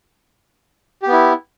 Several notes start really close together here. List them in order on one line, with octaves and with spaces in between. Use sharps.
G4 B3 E4